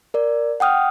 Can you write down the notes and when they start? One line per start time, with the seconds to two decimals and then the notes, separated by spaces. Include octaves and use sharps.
0.14 A#4 D5
0.60 F#5 G5 D#6 F6